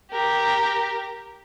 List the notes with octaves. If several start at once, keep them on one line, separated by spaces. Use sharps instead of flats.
G4 A#4